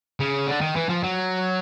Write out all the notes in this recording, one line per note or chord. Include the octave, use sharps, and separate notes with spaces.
C#3
D3
D#3
E3
F3
F#3